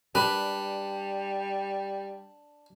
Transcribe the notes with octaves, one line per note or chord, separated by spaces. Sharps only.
G3 D4 B4